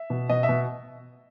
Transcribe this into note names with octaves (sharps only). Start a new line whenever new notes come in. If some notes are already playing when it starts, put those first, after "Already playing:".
Already playing: E5
B2
B2 D#5
E5
B2